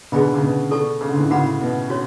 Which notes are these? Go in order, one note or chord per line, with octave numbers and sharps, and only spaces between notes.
B2 D3 G#4 D5 G#5 B5
D3
C#3
B2
A4 D5 A5 C#6
C#3
D3
A2 C#3
A2 C#3 F#4 B4 F#5 B5
B2
D4 F#4 C#5